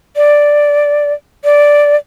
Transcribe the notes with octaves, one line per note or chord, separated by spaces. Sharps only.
D5
D5